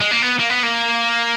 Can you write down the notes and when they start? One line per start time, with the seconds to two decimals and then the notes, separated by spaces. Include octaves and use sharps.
0.01 G#3
0.11 A#3
0.22 B3
0.39 A#3
0.50 B3
0.63 A#3